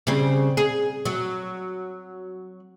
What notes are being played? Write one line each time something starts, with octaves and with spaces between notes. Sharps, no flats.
C#3 G3 C4
G#4
F#3